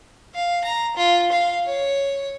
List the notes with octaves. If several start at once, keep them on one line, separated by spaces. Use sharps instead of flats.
F5
A#5
F4
F5
C#5